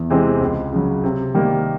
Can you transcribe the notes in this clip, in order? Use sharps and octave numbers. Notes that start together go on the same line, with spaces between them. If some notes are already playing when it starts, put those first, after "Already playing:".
Already playing: E2
C3 E3 G#3 C4
C#2
C#3 F#3
C3
D#3 G3 A#3